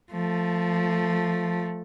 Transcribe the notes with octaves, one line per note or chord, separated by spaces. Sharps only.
F3 A3